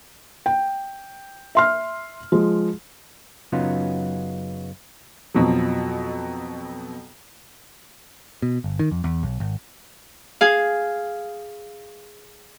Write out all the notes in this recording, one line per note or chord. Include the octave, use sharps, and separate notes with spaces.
G5
E5 C6 F6
F3 G#3
F#2 C#3 F#3 B3 D#4 F4
F2 B2 F3 F#3
B2
G1
D#3
F2
E2
B1
G#1
G#4 F5